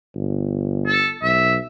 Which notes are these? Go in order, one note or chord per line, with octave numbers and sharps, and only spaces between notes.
G1
A4
B1 E5